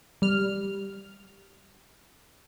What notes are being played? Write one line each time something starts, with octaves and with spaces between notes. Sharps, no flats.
G3 F6